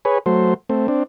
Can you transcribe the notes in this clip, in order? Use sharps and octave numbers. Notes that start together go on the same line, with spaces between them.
G#4 B4 C#5
F#3 A3 C5
A3 C4
C4 D4